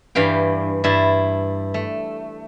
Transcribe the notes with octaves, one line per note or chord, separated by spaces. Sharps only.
G2 E3 F5 G5
G2 E4 A5
A3